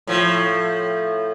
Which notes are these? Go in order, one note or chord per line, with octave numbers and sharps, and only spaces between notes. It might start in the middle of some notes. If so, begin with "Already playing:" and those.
A2 F3